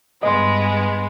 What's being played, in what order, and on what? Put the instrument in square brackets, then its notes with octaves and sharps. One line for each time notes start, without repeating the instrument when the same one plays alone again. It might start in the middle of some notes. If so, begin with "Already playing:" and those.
[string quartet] G2 G#3 B3 [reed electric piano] D#5 C6